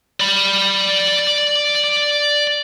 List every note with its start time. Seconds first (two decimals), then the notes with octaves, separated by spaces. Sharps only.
0.20 D5 B5